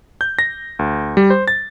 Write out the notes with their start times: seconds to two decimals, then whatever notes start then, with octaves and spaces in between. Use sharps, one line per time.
0.21 G6
0.39 A#6
0.79 D2
1.17 G3
1.30 C5
1.48 A6